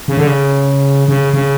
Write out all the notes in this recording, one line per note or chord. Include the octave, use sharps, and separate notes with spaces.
C#3
D3
C#3
C#3
C#3